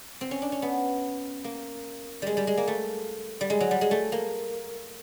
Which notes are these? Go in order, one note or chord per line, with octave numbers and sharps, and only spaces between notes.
C4
C#4
D4
C#4
B3
A#3
G3 G#3
G3
G#3
A#3
A3
G3
G#3
F#3
G3
G#3
A3
A#3